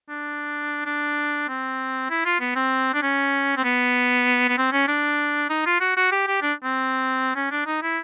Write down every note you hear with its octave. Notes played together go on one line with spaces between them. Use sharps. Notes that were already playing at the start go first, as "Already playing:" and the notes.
D4
D4
C4
E4
F4
B3
C4
D4
C#4
C4
B3
B3
C4
C#4
D4
D#4
F4
F#4
F#4
G4
G4
D4
C4
C#4
D4
D#4
E4